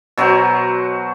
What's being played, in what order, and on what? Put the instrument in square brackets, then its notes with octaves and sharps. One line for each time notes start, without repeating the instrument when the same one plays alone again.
[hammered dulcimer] B2 F#3 F#4 C5